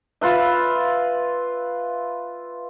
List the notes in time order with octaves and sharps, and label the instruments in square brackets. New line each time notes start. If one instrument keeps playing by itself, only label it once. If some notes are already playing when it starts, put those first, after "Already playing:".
[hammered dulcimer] F4 B4 E5